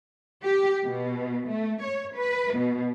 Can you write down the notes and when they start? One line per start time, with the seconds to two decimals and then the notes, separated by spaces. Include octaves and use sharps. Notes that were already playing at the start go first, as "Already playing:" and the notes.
0.42 G4
0.85 B2
1.49 A3
1.82 C#5
2.16 B4
2.56 B2